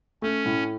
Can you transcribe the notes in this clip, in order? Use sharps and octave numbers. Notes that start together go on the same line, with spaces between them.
A3 C#4
A2